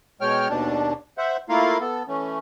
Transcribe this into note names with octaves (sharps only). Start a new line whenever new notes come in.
B2 G#3 C#5 G5 F6
D#2 B2 D4
C5 E5 F#5
A3 A#3 E4 F4 A#4 F5
B3 A4
E3 A3 C#4